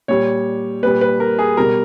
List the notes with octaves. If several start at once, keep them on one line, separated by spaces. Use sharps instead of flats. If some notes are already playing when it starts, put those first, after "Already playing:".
A#2 G3 C#5
A#2 G3 B4
B4
A#4
G#4
B2 G3 A#4